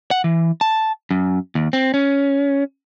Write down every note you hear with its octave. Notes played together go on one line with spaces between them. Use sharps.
F#5
E3
A5
F#2
D#2
C4
C#4